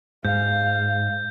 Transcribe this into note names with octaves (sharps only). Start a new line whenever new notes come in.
G#2 F5 G6